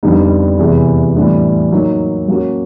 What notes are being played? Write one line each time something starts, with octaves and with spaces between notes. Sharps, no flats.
F2 D3 G3 B3 D#4
E2 C3 E3 G#3 B3
A2 E3 G3 B3 D4
F#3 A#3 D#4
F#3 A#3 C#4 F#4